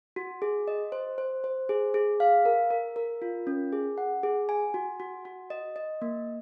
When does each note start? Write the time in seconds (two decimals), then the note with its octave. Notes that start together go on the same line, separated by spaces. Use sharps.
0.16 F#4
0.42 G#4
0.68 D#5
0.92 C5
1.18 C5
1.44 C5
1.69 G#4
1.94 G#4
2.20 F5
2.45 A#4
2.71 A#4
2.96 A#4
3.22 F4
3.47 C#4
3.73 G#4
3.98 F#5
4.23 G#4
4.49 G#5
4.74 F#4
5.00 F#4
5.25 F#4
5.50 D#5
5.76 D#5
6.02 A#3